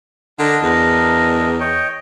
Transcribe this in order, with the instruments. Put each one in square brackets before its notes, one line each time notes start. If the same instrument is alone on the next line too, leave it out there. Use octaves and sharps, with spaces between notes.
[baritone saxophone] D3 [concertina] D4 A#4 D#5
[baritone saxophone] E2
[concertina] C#5 D#5 G5